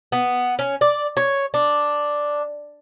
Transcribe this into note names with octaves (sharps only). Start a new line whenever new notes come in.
B3
C#4
D5
C#5
D4